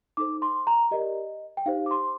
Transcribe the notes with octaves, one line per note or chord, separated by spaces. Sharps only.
D#4 A4 C5 D6
C6
A#5
G4 A#4 D5 D#5
G5
D#4 G4 C5 F5
D6
C6